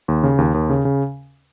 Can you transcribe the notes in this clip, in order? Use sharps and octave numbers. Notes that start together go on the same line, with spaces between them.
D#2
C#3
D#2
D#2
C#3
C#3